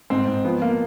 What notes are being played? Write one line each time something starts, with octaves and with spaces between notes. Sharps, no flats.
G#2 C4
G#2
F3 B3
A#3